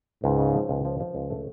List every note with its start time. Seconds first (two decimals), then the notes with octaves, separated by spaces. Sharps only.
0.24 C#2 G#2
0.39 C#3
0.54 F3
0.69 C#2
0.85 F3
1.00 F3
1.15 C#2
1.30 A3